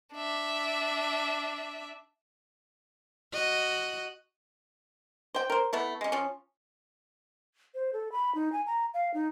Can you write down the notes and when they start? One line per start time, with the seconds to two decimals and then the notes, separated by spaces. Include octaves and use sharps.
0.14 D4 E5
3.33 F#4 D#5
5.34 C5 G5
5.50 A#4 C5
5.73 A3 B3 E4
6.01 G#3 C#4
6.12 F3 C#4
7.75 C5
7.93 A4
8.12 B5
8.35 D#4
8.53 G#5
8.67 A#5
8.94 F5
9.14 D#4